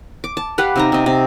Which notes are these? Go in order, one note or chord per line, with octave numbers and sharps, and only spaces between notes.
D6
A5
G4 B4 F5 F#5
C3 D#4 A#5
C3 D#5
C3